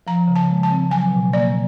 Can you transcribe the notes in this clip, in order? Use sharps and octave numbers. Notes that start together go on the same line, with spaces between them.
F3 A#5
C#3
A5
G#3
A5
C4
F#3 G#5
B2
A#3 D5